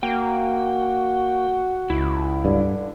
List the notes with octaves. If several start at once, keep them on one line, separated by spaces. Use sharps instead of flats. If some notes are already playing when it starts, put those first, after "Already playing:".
A#3 F#4 G5
C#2 E4
G2 D3